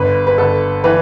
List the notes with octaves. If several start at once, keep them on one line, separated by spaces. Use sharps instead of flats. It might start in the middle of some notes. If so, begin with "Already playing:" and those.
Already playing: G1 B4
B4
G1 A4
E3 B4